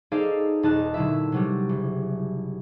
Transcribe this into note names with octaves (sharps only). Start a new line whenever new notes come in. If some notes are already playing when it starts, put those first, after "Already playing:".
D#4 G#4 A4 C5 D5 F5
D#1 D#4 A5 D#6 F#6
A#2 D3 F#3 E4 E5
C3 F#3 G3
F#1